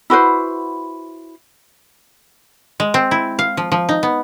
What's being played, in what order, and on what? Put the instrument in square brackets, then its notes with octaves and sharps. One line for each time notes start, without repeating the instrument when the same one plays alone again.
[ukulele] E4 F#4 B4 C5
[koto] G#3
C4
E4
F5
F3
F3
D#4
B3